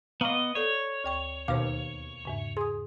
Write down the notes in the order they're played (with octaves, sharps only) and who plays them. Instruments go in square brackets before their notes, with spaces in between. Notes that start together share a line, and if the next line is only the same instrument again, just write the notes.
[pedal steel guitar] B3 D#5 [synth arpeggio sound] F5 [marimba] A#5 C#6 D6
[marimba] A4 D5 [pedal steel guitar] C#5
[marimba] D2 G5 C#6
[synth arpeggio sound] D#2 B2 F5 [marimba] C5 D6
[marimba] E2 G#2 C#3
[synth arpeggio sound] G#4 [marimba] C6 D#6